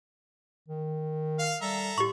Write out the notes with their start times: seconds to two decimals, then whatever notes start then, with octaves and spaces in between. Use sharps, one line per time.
0.68 D#3
1.39 F5 F6
1.62 G3 A4 E5 A#5
1.98 A2 G4 C#6